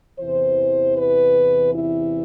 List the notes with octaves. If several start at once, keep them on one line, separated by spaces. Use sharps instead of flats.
E2 C3 E3 C5
B4
E4